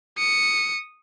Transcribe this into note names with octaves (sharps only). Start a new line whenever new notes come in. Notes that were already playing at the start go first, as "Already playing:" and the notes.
D#6 C#7